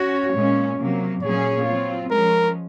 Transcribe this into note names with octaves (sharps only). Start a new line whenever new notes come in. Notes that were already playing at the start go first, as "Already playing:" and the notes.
Already playing: C#4 F#4 C#5
A#2 G#3 C#4
C3 F#3 A#3
A#2 F#3 C#4 G#4 C#5
F#3 C4 F4
F3 G#3 C#4 A#4